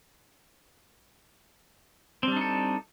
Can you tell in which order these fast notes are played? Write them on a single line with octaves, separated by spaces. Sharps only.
C4 G3 D4 D#4 A4